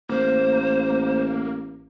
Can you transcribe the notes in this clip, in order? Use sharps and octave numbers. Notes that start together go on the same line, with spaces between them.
A1 A#3 C5